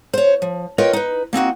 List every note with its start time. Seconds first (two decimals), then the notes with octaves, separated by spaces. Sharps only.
0.13 C5 C#5
0.42 F3
0.78 F4 A#4 B4 C#5 D#5 G5
0.93 D#4 B4
1.33 A#3 C4 D#4 F#4